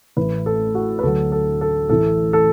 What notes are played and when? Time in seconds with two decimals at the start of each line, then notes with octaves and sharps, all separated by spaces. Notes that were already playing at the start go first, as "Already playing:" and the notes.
0.17 A1 A2 E3 B4
0.46 A4
0.75 F#4
0.99 B4
1.03 D2 D3 F#3 A4
1.32 A4
1.61 A4
1.89 A1 A2 E3 A4
2.33 A4